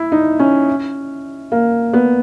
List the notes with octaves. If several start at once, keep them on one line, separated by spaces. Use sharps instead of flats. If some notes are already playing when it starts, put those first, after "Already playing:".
Already playing: E4
D#4
C#4
A#3
B3